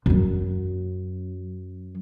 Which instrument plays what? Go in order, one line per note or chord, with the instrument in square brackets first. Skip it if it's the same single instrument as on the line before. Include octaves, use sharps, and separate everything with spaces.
[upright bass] F#2 F#3